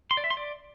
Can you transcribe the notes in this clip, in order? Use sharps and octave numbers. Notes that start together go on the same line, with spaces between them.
C6
D5
E5
C6
D5